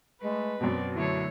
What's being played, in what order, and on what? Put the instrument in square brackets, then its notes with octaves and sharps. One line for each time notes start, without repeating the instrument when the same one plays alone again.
[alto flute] G#3 [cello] A3 [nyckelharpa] B4
[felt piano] F#2 B2 [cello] C4 D5
[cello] D3 F#3 [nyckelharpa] A3 C#5 [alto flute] E4